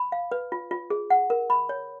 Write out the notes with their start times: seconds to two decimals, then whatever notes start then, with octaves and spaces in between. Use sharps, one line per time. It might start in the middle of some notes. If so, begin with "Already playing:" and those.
Already playing: B5
0.12 F5
0.32 B4
0.52 F4
0.71 F4
0.90 G#4
1.10 F#5
1.30 A#4
1.50 B5
1.69 C#5